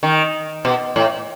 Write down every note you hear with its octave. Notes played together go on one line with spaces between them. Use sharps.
D#3
B2
A2